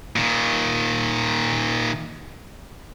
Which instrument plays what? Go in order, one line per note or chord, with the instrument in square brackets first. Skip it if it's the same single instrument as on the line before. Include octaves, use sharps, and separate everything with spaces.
[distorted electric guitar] A#2 D#3